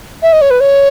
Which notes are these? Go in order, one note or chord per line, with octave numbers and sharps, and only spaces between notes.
E5
D#5
C#5
B4
C#5